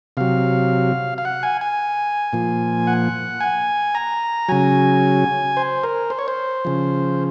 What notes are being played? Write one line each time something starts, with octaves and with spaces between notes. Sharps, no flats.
C3 F#3 F5
F5
F#5
G#5
G#5
A#2 F3
F#5
G#5
A#5
C#3 F#3 G#5
C5
A#4
C5
C#5
C5
C#3 F3